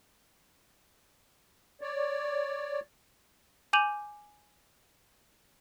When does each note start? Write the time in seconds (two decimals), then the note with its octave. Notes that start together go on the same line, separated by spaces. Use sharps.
1.81 C#5 D5
3.73 G#5 D6 G6 D#7 F7 F#7